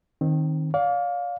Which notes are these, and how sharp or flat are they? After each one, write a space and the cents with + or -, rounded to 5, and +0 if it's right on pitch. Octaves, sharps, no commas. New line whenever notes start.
D#3 +0 C4 +25
D5 -35 F5 +20